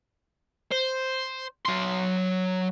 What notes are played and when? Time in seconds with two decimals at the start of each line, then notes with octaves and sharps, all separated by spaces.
0.72 C5
1.65 F#3 C6